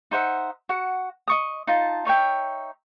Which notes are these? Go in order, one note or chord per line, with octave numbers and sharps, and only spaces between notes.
D#4 C5 E5 F#5
F#4 F#5
D#5 C#6 D#6
D#4 F4 A5
D#4 C#5 E5 G5